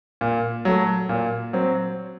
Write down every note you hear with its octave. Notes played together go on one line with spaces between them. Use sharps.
A#2
F#3 A3
A#2
F#3 C4